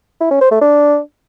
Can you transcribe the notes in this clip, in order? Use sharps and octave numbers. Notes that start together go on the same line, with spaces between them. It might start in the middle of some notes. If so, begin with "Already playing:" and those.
E4
C#4
C5
A3
D4